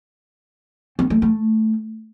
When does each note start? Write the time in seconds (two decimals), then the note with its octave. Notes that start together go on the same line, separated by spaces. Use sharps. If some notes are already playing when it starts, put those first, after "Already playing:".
0.99 C4
1.10 A3
1.22 A3